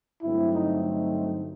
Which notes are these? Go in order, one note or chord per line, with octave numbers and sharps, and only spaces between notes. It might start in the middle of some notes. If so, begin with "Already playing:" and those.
G2 D3 F#3 A3 C4 E4
D#4
D#4